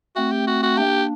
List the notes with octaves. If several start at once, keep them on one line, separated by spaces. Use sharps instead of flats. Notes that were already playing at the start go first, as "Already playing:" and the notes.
A3 C4 F#4
G4
F#4
F#4
A#3 D4 G4